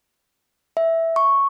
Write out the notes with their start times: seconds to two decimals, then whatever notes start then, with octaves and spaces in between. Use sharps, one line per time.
0.77 E5
1.16 C#6